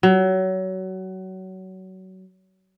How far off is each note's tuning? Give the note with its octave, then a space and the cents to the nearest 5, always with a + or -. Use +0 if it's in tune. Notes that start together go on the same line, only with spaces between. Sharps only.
F#3 +25